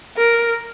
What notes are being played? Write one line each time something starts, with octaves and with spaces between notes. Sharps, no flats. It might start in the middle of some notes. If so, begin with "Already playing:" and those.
A#4